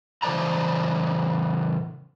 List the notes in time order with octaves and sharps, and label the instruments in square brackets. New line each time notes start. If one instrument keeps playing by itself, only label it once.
[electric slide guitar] C#3 E3 C5 D5 A5 A#5